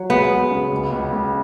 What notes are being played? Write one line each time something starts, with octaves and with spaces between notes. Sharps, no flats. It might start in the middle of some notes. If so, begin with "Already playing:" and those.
Already playing: F#3
G#3 B3
G#3
C#3
C#2
C#2
C#2